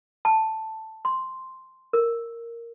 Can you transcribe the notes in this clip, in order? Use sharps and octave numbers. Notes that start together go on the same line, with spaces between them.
A5
C6
A#4